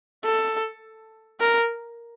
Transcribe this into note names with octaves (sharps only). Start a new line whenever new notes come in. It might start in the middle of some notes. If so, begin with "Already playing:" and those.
A4
A#4